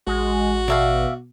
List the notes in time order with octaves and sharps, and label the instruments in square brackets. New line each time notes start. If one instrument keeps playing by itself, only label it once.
[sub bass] A1 [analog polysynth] G#3 [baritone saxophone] F#4
[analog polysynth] B2 [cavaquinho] D5 E5 F5